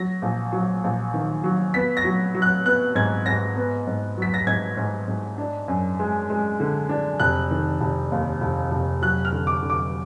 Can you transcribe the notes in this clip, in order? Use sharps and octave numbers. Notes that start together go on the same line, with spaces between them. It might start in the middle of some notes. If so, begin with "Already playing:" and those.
Already playing: F#3 A#6
A#1
F#3
A#1
D#3
F#3
B3 B6
A#6
F#3
F#3
F#6
B3 F#6
G#2 G#6
G#2 A#6
B3
G#2
F#3 B6
A#6
G#2 G#6
G#2
G#2
D4
F#2
G#3
G#3
D3
D4
F1 F#6
D#3
F1
D#2
F1
F1
F#3 F#6
F6
D3
D6
D3
D6